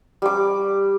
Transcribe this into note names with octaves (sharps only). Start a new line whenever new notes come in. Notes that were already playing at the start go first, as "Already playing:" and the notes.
G3 D6